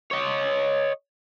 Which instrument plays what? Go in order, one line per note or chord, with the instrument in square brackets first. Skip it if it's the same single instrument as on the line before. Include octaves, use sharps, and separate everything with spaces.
[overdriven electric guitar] C#5 D#5